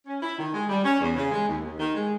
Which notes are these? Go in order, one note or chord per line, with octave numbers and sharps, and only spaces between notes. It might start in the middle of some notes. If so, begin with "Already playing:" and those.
C#4
E4
D#3
G#3
G3
C#4
E2
C#3
G#3
D#2
D#2
D#3
G#3